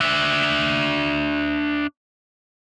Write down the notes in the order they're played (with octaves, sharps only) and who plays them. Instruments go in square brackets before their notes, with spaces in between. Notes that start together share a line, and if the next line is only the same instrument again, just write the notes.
[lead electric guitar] D4 E5